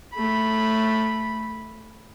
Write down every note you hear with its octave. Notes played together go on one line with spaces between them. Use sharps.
A3 B5